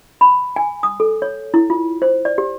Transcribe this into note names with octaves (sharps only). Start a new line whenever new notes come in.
B5
G#5
D#6
A4
C#5
E4
F4
C5
D5
G4